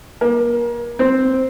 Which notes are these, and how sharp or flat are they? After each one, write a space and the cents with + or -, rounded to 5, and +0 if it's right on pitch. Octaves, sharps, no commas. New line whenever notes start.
A#3 +30
C4 +0